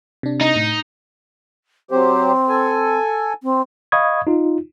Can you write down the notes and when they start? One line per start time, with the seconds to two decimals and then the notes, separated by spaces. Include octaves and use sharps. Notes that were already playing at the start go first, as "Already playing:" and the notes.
0.23 C3 D4
0.41 D#4
0.56 A2
1.91 F#3 C4 G4 C5
2.49 A4 G#5
3.43 C4
3.92 D#5 F5 B5 C#6 D#6 G#6
4.27 D#4 F4